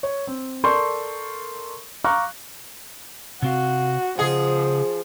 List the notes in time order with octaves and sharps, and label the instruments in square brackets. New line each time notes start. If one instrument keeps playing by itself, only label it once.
[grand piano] C#5
C4
A4 A#4 D5 C6 C#6 G6
F5 A#5 C#6 D6 F6 F#6
[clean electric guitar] C3 C4 F5 [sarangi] F#4
[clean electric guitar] C#3 D#5 F#5 [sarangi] F3 [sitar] G#4